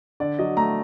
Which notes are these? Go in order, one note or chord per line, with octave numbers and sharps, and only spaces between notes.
D3 D5
F#3 D#5
A3 A#5